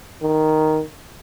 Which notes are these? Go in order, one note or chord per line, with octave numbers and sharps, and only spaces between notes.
D#3